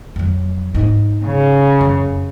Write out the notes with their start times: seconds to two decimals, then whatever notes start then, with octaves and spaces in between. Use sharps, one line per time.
0.16 F2 F#3
0.75 G#2 D#4
1.25 C#3
1.81 F#2